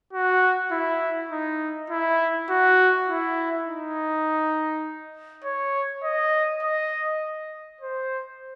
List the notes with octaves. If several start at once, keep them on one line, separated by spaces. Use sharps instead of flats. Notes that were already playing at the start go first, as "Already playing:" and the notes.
F#4
E4
D#4
E4
F#4
E4
D#4
C#5
D#5
D#5
C5